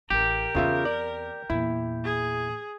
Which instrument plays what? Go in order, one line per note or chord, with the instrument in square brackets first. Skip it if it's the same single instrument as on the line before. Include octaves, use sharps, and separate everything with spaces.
[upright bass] A1 [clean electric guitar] G4 [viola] A#4
[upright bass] E2 C4 [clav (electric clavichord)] C#3 F4 E5
[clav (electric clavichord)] D5
[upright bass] E2 A#2 [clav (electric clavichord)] E4
[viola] G#4